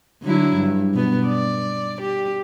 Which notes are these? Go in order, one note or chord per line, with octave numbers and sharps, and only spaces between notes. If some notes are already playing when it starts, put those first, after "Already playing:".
D3 F#3 E4
G2
B2 B3
D5
G4